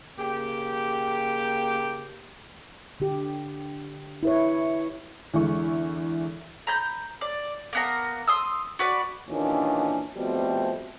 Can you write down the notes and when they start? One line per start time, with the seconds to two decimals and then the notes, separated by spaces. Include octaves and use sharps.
0.18 C#3 A#3 G4
3.00 D3 G4
4.23 E4 B4 C#5
5.34 E2 D3 G#3 E4 C#6
6.67 A#5 B5 G6
7.21 D5
7.73 A#3 B3 A#5
8.27 C6 D#6 E6
8.79 F#4 B4 D5
9.29 D#2 A#2 E3 C#4 D4
10.15 F2 B2 G3 A3 C4